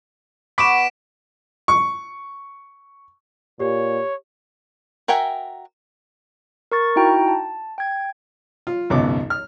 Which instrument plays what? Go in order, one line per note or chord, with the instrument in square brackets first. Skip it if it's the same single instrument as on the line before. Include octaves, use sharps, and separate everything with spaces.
[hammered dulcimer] B2 [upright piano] B5 C#6 D6 [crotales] B6 D7 E7
[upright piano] C#6
[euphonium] A#2 [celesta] G4 [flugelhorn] C#5
[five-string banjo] F#4 A#4 E5 G5 G#5
[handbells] A#4 C#6 A6
D#4 E4 F#4 G5 A#5
A5
G5 G#6
[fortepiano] F4
G#1 C#2 F#2 B2 D6
F6